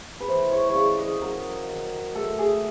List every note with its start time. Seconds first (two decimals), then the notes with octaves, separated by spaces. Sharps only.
0.21 B4
0.28 E3 C5
0.52 C#5
0.69 C#5
0.75 C#3 D5
0.99 D#5
1.22 F#3 A#4
1.69 D#3
2.15 A3 A4
2.39 G#4